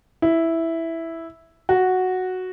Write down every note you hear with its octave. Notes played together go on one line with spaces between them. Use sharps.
E4
F#4